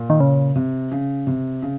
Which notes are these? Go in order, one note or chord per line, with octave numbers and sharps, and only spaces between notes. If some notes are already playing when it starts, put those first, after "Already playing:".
Already playing: A#2
D#3
C#3
C3
C#3
C3
C#3